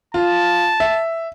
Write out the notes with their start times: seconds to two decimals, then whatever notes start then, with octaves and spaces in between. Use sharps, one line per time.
0.14 F4 A5
0.80 E5